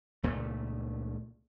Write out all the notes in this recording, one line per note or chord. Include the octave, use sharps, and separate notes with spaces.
C#2 A#2 A3